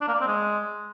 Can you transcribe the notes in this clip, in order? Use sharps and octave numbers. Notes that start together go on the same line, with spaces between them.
D4
A#3
D5
C4
G#3